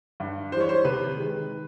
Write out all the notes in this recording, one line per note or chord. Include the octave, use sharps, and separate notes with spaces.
G2
E3 G3 C5 C#5
C5
C3 B4
D#3 G#3